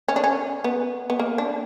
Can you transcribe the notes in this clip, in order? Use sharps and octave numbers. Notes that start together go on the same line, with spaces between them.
C#4
D4
C#4
B3
B3
A#3
D4